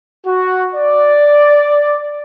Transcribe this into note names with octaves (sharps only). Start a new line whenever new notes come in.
F#4
D5